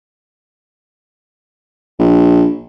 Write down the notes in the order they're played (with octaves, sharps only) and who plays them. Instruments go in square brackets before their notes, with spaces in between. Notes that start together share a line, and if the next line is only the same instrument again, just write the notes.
[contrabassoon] A#1